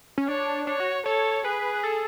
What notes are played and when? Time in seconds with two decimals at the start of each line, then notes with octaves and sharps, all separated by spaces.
0.18 C#4
0.28 D4 C#5
0.67 D4 C#5
0.80 F#4
1.06 A4 C#5
1.45 G#4 B4
1.83 A4